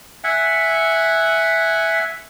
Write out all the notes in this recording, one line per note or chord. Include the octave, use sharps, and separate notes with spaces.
E5 F#5 G#5